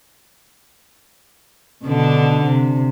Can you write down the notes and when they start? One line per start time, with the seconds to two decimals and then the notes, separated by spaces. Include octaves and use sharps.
1.84 B2 D3 D4
2.45 C3